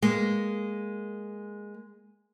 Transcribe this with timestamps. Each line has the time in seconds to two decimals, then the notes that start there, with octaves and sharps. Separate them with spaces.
0.02 G#3 A#3